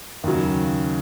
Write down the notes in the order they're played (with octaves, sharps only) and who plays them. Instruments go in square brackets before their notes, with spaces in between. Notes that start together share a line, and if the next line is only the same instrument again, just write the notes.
[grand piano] D#2 C#3 F#3